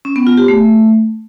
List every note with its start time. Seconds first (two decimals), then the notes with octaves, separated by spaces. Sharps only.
0.05 C#4
0.16 B3
0.27 F4
0.37 G4
0.48 A3